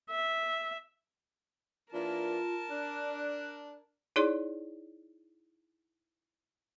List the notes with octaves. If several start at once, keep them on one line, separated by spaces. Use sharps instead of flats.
E5
E3 A#3 D4 F4 A#4 A5
D4 F#6
D#4 E4 G#4 C#5 D5 C6